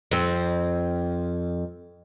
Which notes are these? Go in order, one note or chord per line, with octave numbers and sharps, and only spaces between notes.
F2 C4